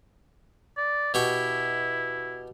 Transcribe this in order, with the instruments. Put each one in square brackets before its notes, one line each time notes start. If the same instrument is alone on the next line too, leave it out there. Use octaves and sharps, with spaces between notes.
[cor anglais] D5
[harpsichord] B2 G4 C#6 [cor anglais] E4